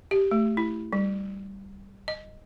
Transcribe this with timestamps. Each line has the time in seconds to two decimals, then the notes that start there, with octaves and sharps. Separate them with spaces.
0.11 G4
0.31 A3
0.57 E4
0.93 G3
2.08 D#5